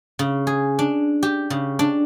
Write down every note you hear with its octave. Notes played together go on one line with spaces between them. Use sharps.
C#3
G#4
D4
G4
C#3
D4